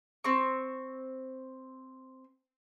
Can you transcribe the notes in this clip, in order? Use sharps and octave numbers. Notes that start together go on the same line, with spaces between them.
C4 C#6